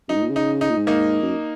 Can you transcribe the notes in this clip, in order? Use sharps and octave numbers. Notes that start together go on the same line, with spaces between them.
F#2 D#4
G#2
A#2
C#3
D#4
D#4
A#2
G#2
A#3 D#4
F#2